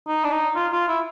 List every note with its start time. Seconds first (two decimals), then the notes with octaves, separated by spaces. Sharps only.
0.08 D#4
0.24 D4
0.32 D#4
0.56 F4
0.72 F4
0.88 E4